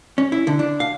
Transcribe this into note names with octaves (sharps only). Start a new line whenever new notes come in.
C#4
E4
D3
D4
F5